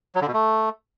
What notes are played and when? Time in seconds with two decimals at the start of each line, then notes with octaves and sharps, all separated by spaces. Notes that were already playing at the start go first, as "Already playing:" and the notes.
0.15 F#3
0.21 D3
0.28 B2
0.34 A3